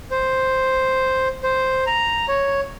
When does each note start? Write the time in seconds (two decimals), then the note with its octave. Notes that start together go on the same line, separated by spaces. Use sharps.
0.11 C5
1.44 C5
1.87 A#5
2.28 C#5